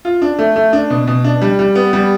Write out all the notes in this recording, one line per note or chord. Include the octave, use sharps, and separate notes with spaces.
F4
D4
A3
A3
D4
B2
B2
D4
G3
G3
B3
G3